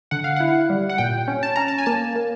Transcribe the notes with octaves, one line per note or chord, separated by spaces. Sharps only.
D3 F#5
F5
E4 F#5
G3
F#5
A#2 G5
C#4
A5
C#4 A#5
A5
G#5
A#3 A5
A#3